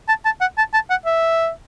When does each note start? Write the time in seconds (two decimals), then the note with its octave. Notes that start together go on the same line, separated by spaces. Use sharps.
0.08 A5
0.25 A5
0.41 F#5
0.58 A5
0.74 A5
0.90 F#5
1.05 E5